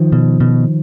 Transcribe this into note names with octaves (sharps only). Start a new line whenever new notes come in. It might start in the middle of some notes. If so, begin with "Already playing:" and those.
Already playing: D#3 F3
B2
B2